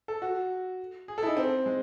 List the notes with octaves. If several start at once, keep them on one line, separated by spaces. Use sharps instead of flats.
A4
F#4
G#4
A4
E4
D#4
C4
G#3